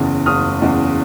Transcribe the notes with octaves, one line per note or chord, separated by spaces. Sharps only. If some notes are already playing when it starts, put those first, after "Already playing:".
Already playing: F#1 E2 C#3
F#1 D#6 F6
E2 C#3